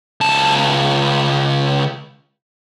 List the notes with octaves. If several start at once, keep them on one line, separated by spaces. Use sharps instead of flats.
C#2 A5